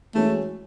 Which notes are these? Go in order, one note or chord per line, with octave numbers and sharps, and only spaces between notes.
E3 G#3 A3 C#4 F#4